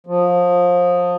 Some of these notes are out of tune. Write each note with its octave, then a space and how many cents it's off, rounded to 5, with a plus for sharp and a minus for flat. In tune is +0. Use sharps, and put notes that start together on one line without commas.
F3 +25